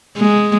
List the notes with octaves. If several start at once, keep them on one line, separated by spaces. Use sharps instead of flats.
G#3